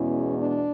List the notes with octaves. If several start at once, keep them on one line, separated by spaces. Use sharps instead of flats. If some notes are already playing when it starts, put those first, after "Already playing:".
Already playing: E2 B2 G#3 C#4 E4
D4